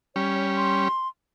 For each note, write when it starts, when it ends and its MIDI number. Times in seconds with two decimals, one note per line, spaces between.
0.16 0.88 55
0.16 0.88 61
0.16 0.47 73
0.56 1.08 84